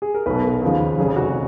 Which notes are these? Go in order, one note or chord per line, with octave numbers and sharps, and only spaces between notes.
G#4
A#4
B1 B2 B4
D#2 C#3 F3
F1 F2 C#3 G#4
F#4